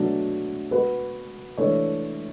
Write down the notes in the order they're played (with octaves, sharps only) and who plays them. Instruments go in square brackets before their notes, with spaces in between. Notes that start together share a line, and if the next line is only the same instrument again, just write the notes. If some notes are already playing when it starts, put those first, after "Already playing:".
Already playing: [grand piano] B2 F#3 A3 D4 F#4
B3 F#4 B4
E3 A3 D4 A4 C#5